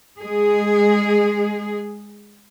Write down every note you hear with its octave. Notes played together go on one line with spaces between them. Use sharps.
G#3 G#4